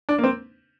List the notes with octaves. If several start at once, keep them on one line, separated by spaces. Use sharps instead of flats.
D4
A#3
C4